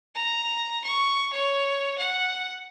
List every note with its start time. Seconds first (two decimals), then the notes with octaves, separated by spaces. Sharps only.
0.15 A#5
0.84 C#6
1.33 C#5
1.98 F#5